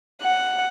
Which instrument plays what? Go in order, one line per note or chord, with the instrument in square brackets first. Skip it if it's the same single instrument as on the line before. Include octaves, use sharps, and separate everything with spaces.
[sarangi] F#5